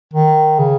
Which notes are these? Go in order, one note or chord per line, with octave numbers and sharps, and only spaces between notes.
D#3
C#3